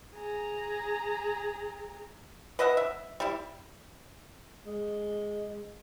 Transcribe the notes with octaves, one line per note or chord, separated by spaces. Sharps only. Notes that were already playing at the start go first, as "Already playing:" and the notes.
G#4 A#5
B4 D#5 E5 F#5
E5
G3 E4
G#3